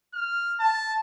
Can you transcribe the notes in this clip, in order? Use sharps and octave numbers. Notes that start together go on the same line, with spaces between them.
F6
A5